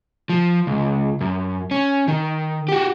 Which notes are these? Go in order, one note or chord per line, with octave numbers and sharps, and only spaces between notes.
F3
C#2
F#2
C#4
D#3
F#4 G4